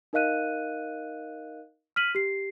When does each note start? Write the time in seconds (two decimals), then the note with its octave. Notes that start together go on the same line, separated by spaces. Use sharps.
0.13 D#4 A#4 D#5 F5 F#6 D#7
1.96 F6 B6 D#7 F#7
2.15 G4 C7